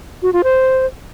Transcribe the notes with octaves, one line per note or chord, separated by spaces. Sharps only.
F#4
F4
C5